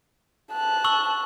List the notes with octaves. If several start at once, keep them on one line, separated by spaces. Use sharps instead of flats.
A5 F#6
C#6 E6 F#7